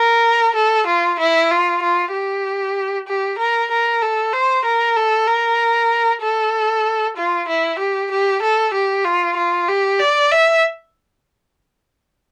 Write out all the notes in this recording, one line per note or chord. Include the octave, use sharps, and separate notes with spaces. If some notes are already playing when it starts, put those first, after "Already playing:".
Already playing: A#4
A4
F4
E4
F4
F4
G4
G4
A#4
A#4
A4
C5
A#4
A4
A#4
A4
F4
E4
G4
G4
A4
G4
F4
F4
G4
D5
E5